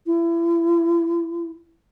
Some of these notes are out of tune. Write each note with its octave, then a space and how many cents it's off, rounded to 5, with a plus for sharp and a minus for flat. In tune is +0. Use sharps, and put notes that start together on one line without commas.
E4 +35